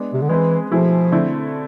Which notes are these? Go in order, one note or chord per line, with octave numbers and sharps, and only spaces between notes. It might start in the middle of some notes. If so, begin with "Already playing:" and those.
Already playing: G#3 B3 D4
C3
D3
E3 G#3 C4 G#4 B4
B2 F3 A3 E4 G#4
D3 A3 C4 E4